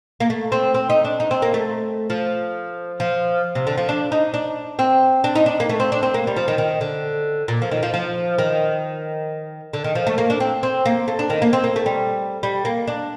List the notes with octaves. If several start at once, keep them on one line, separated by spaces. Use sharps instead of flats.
A#3
A3
C4
C4
D#4
D4
D#4
C4
A#3
A3
F3
F3
C3
D3
F3
D4
D#4
D4
C4
D4
D#4
D4
A#3
A3
C4
D4
C4
A#3
G3
F3
D#3
D#3
D3
A#2
F3
D#3
F3
F3
D#3
D3
D#3
F3
A3
A#3
D4
C4
C4
A#3
A3
D4
D#3
A#3
C4
A#3
A3
G3
G3
A#3
D4